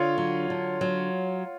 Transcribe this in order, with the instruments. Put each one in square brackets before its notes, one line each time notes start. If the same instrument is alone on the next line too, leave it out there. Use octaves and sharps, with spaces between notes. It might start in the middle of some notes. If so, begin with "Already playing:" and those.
Already playing: [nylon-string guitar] D3 [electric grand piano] F4 C#5
[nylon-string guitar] F#3
D3
F#3